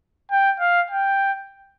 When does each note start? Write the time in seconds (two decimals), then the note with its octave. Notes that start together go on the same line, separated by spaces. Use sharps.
0.31 G5
0.60 F5
0.90 G5